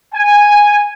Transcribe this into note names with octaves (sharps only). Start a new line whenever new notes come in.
G#5